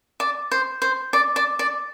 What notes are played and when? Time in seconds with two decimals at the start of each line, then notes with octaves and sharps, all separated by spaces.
0.20 D5
0.51 C5
0.82 C5
1.13 D5
1.36 D5
1.59 D5